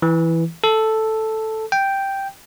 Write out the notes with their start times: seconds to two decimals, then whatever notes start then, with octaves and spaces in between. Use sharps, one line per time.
0.02 E3
0.64 A4
1.72 G5